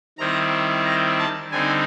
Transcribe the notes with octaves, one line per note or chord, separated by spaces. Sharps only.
D#3 G3 C4 E4 A#5
A#5
A5
D3 G3 C4 D#4 G#5